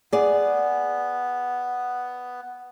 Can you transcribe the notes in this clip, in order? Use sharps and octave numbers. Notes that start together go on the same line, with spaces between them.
B3 G#4 D5